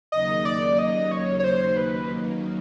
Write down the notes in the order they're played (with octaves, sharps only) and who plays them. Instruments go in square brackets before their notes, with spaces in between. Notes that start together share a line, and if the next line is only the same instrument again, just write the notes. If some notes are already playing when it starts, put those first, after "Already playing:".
[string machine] D#2 C#3 F#3 A#3 D#4 [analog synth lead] D#5
[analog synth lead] D5
D#5
C#5
C#5
C5
B4